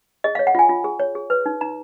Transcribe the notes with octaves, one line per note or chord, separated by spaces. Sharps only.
G#4 D#5
F5
C#5
F#5
F4 G#5
F4
G#4
C#5
G#4
B4
D#4
D#4 A#5